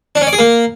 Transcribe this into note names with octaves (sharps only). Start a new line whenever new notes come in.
D4
C#4
D5
G#4
A#3